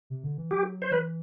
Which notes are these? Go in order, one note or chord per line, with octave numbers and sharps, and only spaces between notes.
C3
D3
E3
F#3 G4
C5
E3 B4